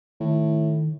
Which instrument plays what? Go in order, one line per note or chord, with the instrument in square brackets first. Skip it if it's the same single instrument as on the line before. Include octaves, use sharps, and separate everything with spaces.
[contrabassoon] A2 [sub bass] D#3